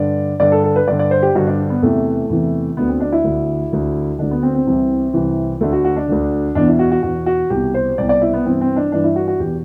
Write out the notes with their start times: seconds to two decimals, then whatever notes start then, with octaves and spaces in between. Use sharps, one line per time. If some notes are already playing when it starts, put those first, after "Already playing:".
Already playing: G2 D3 D5
0.40 G2 D3 D5
0.52 A4
0.64 A4
0.76 B4
0.87 G2 D3 D5
0.99 D5
1.11 C5
1.22 G4
1.35 G2 D3 F#4
1.47 D4
1.70 B3
1.82 E2 C3 E3 A3
2.30 E2 C3 E3
2.77 D2 D3 B3
2.88 C4
3.00 D4
3.12 E4
3.24 D2 D3
3.72 D2 D3
4.19 D2 D3 D4
4.31 B3
4.43 C4
4.55 C4
4.66 C2 C3 E3
5.14 C2 C3 E3
5.61 D2 D3 A3
5.73 F#4
5.84 F#4
5.96 D4
6.08 D2 D3
6.55 E2 B2 D4
6.68 E4
6.79 F#4
6.92 F#4
7.03 E2 B2 F#4
7.26 F#4
7.50 C2 B2 G4
7.74 C5
7.98 C2 B2 D5
8.09 D5
8.22 E4
8.33 B3
8.45 G2 E3 C4
8.61 C4
8.76 D4
8.92 G2 E3 D4
9.04 E4
9.16 F#4
9.28 F#4
9.40 E2 B2 G4